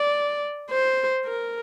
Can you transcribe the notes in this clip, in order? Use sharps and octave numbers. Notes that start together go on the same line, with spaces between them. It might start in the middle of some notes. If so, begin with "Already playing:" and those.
Already playing: D5
C5
A#4